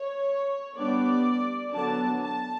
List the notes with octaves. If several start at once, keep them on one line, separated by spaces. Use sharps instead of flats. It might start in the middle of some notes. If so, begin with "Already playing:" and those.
Already playing: C#5
G3 B3 D4 D5
D3 F#3 B3 D4 A5
A5